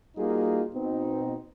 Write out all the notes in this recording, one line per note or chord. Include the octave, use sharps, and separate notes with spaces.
G3 A#3 D#4 F4 F#4 G#4
B2 C4 D#4